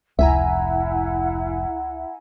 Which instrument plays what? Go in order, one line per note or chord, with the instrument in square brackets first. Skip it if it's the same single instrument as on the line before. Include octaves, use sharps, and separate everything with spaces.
[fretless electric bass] F1 [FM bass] C#2 [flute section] E4 F#5 [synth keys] E5 G#5 A#5